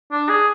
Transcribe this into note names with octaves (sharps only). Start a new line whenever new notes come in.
D4
G#4